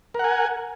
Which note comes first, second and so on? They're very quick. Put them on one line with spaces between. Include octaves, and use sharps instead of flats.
A#4 F#5 G#5